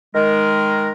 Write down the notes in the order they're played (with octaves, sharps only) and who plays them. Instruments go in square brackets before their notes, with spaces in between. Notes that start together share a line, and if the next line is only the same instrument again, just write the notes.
[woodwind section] D#3 G#3 A#4